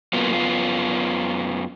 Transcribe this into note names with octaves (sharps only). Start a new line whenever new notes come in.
F#3 A#3 B3 F4
F#2 B3 F4